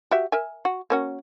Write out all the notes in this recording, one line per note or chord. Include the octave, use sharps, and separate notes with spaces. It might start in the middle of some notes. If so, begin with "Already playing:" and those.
F#4 G4 E5
A#4 E5 G#5
F#4
A#3 C#4 F#4